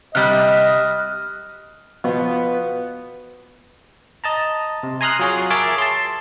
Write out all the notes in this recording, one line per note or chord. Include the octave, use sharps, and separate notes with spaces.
C3 G3 D#5 F6 F#6
B2 F3 B3
D#5 A5 A#5
C3
G#5 A#5 C6 D#6 F6 F#6
F#3 F4 G#4 C#5
G#4 A#4 C#5 E5 A5 D6
A5 C6